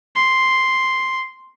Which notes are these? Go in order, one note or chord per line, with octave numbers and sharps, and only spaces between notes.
C6